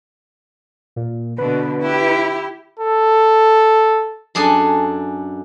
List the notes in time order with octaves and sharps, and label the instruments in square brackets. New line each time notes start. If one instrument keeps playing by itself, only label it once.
[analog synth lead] A#2
[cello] B2 D3 [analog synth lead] B4
[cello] E4 G4
[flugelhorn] A4
[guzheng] F#2 D4 G#4 A4 G#5